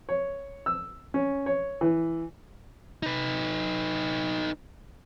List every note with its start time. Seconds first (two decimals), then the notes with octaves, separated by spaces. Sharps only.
0.09 C#5
0.66 E6
1.14 C#4
1.46 C#5
1.81 E3
3.03 D#4 B4